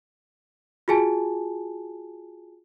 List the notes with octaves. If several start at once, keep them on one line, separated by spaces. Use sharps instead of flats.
F4 F#4 G#4 G#5 A5